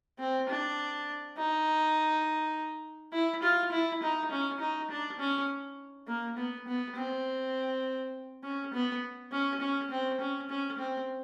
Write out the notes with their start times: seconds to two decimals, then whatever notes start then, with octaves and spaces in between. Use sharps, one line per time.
0.19 C4
0.49 D4
1.37 D#4
3.13 E4
3.43 F4
3.72 E4
4.03 D#4
4.31 C#4
4.60 D#4
4.90 D4
5.19 C#4
6.07 A#3
6.37 B3
6.67 B3
6.96 C4
8.44 C#4
8.73 B3
9.32 C#4
9.61 C#4
9.91 C4
10.20 C#4
10.50 C#4
10.78 C4